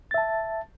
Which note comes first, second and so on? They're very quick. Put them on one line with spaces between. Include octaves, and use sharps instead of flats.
A6 E5 A5